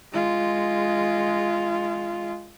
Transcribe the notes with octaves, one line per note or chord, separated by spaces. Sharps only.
G#3 F4